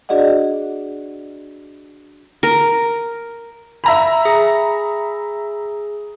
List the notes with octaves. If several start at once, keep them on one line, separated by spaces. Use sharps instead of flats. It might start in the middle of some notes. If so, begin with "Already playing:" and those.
D4 F#4 G#4 D5 D#5 F#5
A#4
E5 A#5 B5
G#4 A#6